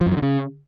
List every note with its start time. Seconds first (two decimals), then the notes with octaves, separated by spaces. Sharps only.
0.01 F3
0.06 F#2
0.12 F3
0.17 D3
0.22 C#3